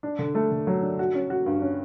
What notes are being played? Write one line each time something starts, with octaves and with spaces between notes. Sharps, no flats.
D4
D3
A3
D3
F#3
D4
F#4
C#4
F#4
G2
C#4